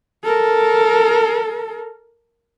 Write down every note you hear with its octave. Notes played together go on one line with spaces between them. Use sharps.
A4 A#4